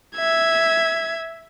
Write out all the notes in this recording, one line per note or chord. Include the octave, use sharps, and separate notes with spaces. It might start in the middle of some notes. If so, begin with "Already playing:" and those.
E5 G#6